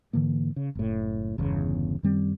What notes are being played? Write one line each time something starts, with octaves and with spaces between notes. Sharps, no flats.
G#2 D3 E3 A#3
C#3
F#1 A2
G1 E2 C#3
F#2 D#3 G3 C4